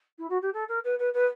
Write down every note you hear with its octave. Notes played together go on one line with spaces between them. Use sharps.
E4
F#4
G4
A4
A#4
B4
B4
B4